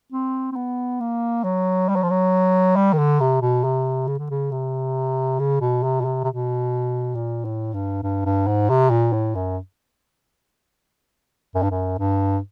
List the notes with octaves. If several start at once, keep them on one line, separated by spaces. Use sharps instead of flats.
C4
C4
B3
A#3
F#3
G3
F#3
F3
F#3
G3
D#3
D3
C3
B2
C3
C#3
D3
C#3
C3
C#3
B2
C3
B2
C3
C3
B2
A#2
A2
G2
G2
G2
G#2
C3
A#2
A2
F#2
F#2
G2
F#2
G2